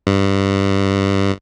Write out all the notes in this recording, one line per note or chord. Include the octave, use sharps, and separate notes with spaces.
G2